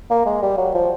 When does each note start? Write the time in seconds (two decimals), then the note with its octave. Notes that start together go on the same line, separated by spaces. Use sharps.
0.11 A#3
0.26 G#3
0.43 G3
0.58 F#3
0.74 F3